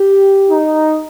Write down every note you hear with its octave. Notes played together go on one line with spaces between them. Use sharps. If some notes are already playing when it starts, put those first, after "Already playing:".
Already playing: G4
D#4